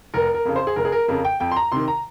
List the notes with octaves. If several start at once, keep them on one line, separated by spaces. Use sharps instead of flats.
F1 A#4
A#4
F2 C#3
C5
G#4
F1 A#4
G#4
A#4
F2 C#3 A#4
G5
F2 G5
C6
A#5
C3 D#3 C6
A#5